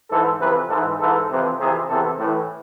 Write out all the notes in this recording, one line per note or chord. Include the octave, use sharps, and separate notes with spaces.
G#2 E3 A4
F2 C3 E3 B4
G#2 E3 A4
G#2 E3 A4
F2 C3 E3
F2 C3 E3 G#4
E2 C3 E3 A4
A2 E3 A4